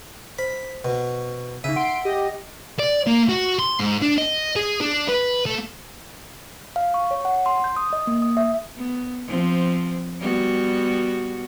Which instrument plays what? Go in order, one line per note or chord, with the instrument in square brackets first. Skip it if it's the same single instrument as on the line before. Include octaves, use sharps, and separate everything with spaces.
[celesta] C5 [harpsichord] B5
[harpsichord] B2
[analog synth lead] C#3 [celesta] D#4 D#7 [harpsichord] E5
[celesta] F#5 [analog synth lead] C6 [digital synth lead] D7
[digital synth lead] G4 [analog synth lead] D#5
[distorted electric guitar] D5
A#3
F#4
C6
G#2
D4
D#5
G#4
D4
B4
A3
[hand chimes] F5
C#6
C#5
F#5
C6
G6
D#6
D#5
A#3
D#6
E5
[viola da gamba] B3
F3 C4
G3 B3 F#4